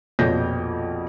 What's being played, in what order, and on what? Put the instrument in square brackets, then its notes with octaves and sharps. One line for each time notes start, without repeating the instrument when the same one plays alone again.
[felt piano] A#1 F2 B2 C#5 G6 A#6